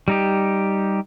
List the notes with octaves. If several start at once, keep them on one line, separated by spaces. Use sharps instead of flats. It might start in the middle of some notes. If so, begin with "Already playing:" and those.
G3 D#4 G4